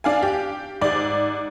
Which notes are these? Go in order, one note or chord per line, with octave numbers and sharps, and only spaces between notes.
D4 F5 G#5
G4
G#2 D5